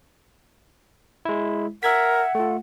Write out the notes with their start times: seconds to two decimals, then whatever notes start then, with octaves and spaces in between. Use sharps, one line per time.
1.25 G#3 E4
1.83 A#4 E5 F#5 G#6 B6
2.35 A3 F4 A4